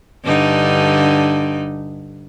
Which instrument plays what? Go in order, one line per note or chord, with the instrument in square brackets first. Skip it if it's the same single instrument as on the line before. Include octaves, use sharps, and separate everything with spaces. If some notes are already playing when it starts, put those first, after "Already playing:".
[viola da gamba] G2 D3 D#4